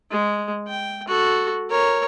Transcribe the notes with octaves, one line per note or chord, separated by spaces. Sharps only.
G#3
G5
F#4 A4
A#4 C#5